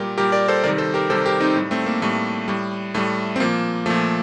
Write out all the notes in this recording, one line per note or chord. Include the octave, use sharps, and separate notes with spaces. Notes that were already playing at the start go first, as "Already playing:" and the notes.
Already playing: A#2 G3 G4 A#4
A#2 G3 G4 A#4
A#4 D5
A4 C5
C3 D#3 G3 A#4 D5
A4 C5
G4 A#4
C3 D#3 G3 A4 C5
G4 A#4
C4 D#4
A2 G3
A3 C4
A#3
A2 G3 A3
A2 G3
A2 G3 A3
C4
A#2 F3 A#3
A#2 F3 A3